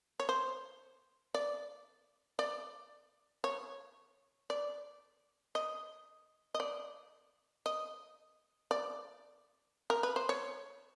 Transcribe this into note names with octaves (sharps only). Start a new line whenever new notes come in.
C#5
C5
D5
D5
C#5
D5
D#5
D#5
D5
D#5
D5
A#4
B4
C5
C#5